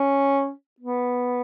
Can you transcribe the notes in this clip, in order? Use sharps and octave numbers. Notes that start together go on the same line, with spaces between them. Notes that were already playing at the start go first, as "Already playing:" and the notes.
Already playing: C#4
B3